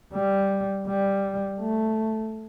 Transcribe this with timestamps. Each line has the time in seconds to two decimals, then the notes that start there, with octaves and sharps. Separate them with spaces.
0.14 G3
0.87 G3
1.60 A3